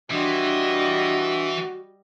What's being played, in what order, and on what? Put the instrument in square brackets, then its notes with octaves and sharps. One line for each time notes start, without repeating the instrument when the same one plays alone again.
[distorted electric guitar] E3 [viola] G3 D#5 [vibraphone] D4 C6 [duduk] F#4